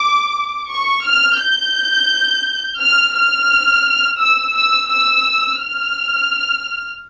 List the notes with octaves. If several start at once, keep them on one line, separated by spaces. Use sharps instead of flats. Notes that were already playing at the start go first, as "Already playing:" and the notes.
Already playing: D6
C#6
F6
G6
F6
F6
E6
E6
E6
F6